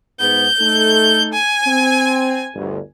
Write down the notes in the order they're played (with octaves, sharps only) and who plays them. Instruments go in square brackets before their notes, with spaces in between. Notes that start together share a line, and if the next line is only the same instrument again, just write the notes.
[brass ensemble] G#2 B3 [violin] G6
[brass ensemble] A3 D#4 A4
[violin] G#5
[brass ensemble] C4
G1 D2